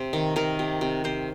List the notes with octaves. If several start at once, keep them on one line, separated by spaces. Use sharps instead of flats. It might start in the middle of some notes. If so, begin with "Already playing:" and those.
Already playing: C3 C5
D#3
D#3 A#4
C3
C3
C3 C5